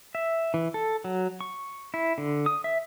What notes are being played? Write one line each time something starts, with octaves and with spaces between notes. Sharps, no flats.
E5
E3
A4
F#3
C#6
E4
D3
D#6
E5